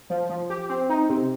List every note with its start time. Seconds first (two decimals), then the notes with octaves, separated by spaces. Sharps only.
0.10 F3
0.30 F3
0.50 G4
0.69 C4
0.89 D#4
1.09 C3